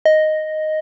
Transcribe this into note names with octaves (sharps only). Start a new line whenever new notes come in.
D#5